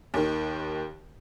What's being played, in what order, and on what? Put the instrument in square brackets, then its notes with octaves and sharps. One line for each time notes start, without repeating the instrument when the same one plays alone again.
[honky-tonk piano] D#2 D#3